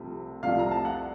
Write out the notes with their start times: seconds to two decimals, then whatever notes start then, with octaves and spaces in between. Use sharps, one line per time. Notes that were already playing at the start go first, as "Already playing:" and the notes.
Already playing: C2 C3 F3 A3
0.43 C2 C3 F3 A3 F5
0.59 A#5
0.71 A5
0.85 F#5